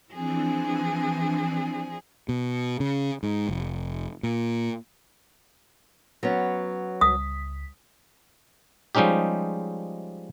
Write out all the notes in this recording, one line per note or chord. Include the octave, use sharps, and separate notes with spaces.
E3 F3 C4 D4 G#4
B2
C#3
G#2
F1
A#2
F#3 B3 C#4
C#2 D#6 B6
F3 G3 G#3 C#4 D#4 G4